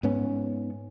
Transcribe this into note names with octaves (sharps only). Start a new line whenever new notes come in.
G#2 B3 C#4